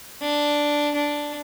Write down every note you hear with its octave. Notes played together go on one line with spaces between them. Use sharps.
D4
D4